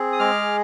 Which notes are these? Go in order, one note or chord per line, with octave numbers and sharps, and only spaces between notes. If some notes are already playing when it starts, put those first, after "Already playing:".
Already playing: C4 G#4
D#6
G#3 D6 F6